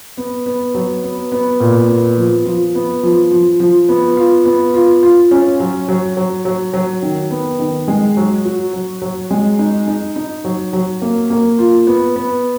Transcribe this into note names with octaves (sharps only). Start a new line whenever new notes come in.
B3
B3
F#3
B3
B3
A#2
B3
F3
F3
B3
F3
F3
F3
B3
F4
B3
F4
F4
C#4
F#3
F#3
F#3
F#3
F#3
D#3
B3
D#3
G#3
F#3
F#4
F#3
F#3
G#3
D#4
D#4
D#4
F#3
F#3
A#3
A#3
F4
B3
B3